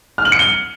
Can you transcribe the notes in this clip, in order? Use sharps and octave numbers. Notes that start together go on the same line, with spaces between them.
F6
F#7
C#7
G7